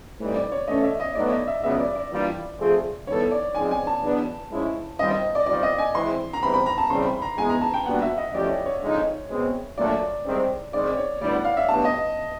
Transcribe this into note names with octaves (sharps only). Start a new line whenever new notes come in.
A2 E3 G3 C4 D#4
D5
C#5
E3 A3 C#4 D#5
E5
D#5
A2 F#3 B3 D#4 D5
D#5
E5
C#2 C#3 F#3 B3 E5
D5
D5
E3 G3 A#3 D4 F4
F3 A3 C4 F4 G#4
D#3 G3 B3 E4 A4 C#5
D5
F3 G#3 C4 D#4 G#5
G#5
A5
E2 B2 F#3 B3 D4
G#2 F3 G#3 C#4 E4
D#3 G3 C4 F4 D#5
D#5
D5
C3 D#3 G3 C4 F4 D5
D#5
G#5
E3 G#3 C4 E4 C6
A#5
E2 C3 E3 G3 C4 B5
B5
A#5
A5
C#3 E3 G3 C4 C6
B5
A#5
E3 G#3 B3 G#5
A#5
A5
G5
A#2 G3 B3 D4 F#4 F#5
E5
D#5
F3 A3 C#4 E4 G4 D5
C#5
C#5
D3 F3 G#3 C4 D#4
B2 G#3 C4
A#2 F#3 A3 D4 D5
C2 C3 D#3 G#3 C4
D#3 G#3 C4 D5
C#5
D2 D3 G3 B3 E4 D5
F#5
F5
E5
A2 F#3 B3 D4 G4 A5
D#5